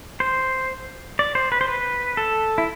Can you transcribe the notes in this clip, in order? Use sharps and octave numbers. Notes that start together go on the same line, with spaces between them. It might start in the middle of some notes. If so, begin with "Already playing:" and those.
C5
D5
C5
B4
C5
B4
A4
E4